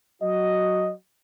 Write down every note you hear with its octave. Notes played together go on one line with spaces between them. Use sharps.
F#3 F#4 D#5